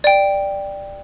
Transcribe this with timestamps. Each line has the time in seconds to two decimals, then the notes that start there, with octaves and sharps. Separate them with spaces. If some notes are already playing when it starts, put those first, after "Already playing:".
0.04 D5 G5